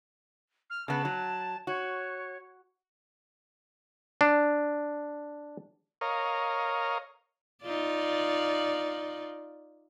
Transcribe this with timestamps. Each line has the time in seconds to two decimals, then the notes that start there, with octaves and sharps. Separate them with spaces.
0.70 F6
0.88 C#3 B3 A5
1.05 F#3
1.67 F#4 C#5
4.21 D4
6.01 A#4 C#5 D#5 F5
7.63 D#4 F4 D5